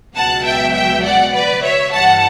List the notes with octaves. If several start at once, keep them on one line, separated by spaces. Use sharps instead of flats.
C#2 B2 F#3 F#5 A5
E5 G5
E5 G5
D5 F#5
B4 D5
C#5 E5
G2 E3 G3 F#5 A5